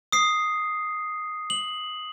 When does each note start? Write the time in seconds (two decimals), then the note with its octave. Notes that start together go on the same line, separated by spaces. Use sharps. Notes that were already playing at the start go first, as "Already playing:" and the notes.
0.12 D#6 C7
1.50 F#7